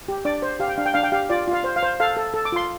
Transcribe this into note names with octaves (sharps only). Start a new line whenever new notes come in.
G4
D4 D5 D6
C5
G4 F5
G5
D4 F5
G5
D4 F5
G5
G4 F5
F4 D5
F4
F5
C5
F5
C5
A4 F5
A4
A4
D6
F4 C6